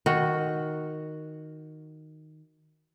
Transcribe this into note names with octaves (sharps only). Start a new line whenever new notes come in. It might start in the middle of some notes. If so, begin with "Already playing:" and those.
D#3 F#4